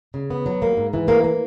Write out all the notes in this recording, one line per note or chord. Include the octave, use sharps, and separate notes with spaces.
C#3
B3
F#3
A#3
G#2
E3
A#3
A#3